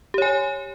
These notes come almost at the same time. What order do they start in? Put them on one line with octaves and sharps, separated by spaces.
G4 C#5 G#5